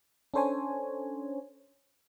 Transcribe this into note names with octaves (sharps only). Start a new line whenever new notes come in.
C#4 D4 A4 C5 C#5 G#5